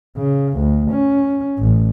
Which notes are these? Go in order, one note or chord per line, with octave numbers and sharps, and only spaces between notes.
C#3
D2
C#4
A1